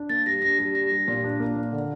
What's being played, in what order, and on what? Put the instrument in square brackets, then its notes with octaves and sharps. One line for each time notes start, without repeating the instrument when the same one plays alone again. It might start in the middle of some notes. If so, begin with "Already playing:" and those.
Already playing: [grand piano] D4
[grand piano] A#3 [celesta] A6
[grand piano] G3 [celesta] A#6
[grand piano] D4 [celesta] A#6
[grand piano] G3
[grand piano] D4 [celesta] A#6
[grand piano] G3
A#2
D4
A#3
A#2
D3